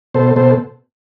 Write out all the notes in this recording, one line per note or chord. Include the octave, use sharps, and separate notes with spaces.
B2 A4 C5
B2 A4 C5